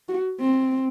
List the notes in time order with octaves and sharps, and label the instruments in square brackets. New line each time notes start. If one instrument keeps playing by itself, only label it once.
[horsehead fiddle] F#4
C4